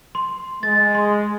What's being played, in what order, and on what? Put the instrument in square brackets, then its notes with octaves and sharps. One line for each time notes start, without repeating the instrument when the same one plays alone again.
[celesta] C6
[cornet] G#3 [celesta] A6
[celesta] C6